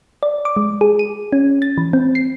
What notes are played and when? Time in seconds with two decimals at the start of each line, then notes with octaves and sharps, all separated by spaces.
0.23 D5
0.45 D6
0.56 G#3
0.81 G#4
0.99 D#7
1.33 C#4
1.62 A6
1.78 E3
1.93 C4
2.15 C7